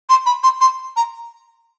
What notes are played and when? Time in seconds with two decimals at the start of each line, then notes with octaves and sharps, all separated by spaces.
0.09 C6
0.26 B5
0.43 C6
0.61 C6
0.96 A#5